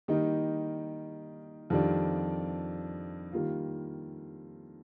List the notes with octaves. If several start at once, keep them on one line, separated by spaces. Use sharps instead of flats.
D#3 G3 A#3 D#4
F2 D#3 G3 D4
D#3 G3 A#3 F4